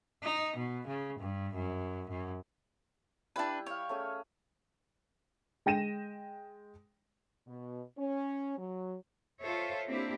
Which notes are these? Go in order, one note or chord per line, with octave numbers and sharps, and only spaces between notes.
D#4
B2
C#3
G2
F#2
F#2
G3 D4 E4 B4 G5
C#5 F5 G5
A3 C#4 G#4
G#3 G5 A#6 D#7 E7
B2
C#4
F#3
F4 A4 C5 C#5 E5
A#3 C4 D4 E4 G4